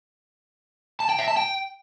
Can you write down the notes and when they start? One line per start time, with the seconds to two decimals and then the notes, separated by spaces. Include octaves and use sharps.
1.00 A5
1.09 G5
1.19 E5
1.28 A5
1.37 G5